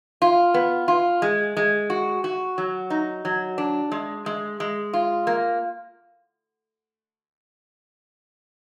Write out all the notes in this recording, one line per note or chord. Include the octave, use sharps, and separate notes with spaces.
F4
B3
F4
G#3
G#3
F#4
F#4
F#3
D#4
F#3
D4
G#3
G#3
G#3
F4
A#3